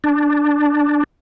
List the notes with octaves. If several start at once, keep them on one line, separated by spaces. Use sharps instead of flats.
D4